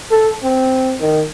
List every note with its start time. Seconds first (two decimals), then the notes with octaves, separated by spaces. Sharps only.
0.11 A4
0.43 C4
1.00 D#3